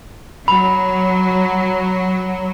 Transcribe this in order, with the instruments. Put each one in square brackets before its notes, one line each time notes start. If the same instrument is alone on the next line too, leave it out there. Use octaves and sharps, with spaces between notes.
[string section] F#3 [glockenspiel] B5